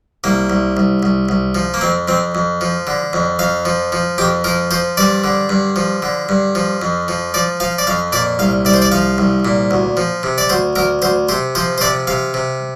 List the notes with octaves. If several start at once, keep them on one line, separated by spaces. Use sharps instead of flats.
C2 A#3
C2
C2
C2
C2
F3
A#3
F2 C4
F2 C4
F2
F3
D3
F2
F2 F5
F3
F3
F2 G4
F3 A#4
F3 C5
G2 D5
D3
G2
F3
D3
G2
F3
F2
F3
F3 D5
F3 F5
D5
F2 F5
A#2 D5
C2 F5
C2 D5
C5
D5
F3 F5
C2
A#2
D2
F3
C3
D5
D2 C5
D2 A#4
D2 C5
C3 C5
F3 C5
C5
C3 D5
C3 F5
C3